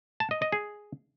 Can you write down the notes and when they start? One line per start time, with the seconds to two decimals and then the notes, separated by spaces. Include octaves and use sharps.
0.20 A5
0.31 D#5
0.42 D#5
0.52 G#4